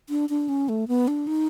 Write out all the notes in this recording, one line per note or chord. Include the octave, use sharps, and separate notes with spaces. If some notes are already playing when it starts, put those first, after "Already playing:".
D4
D4
C#4
A3
B3
D4
D#4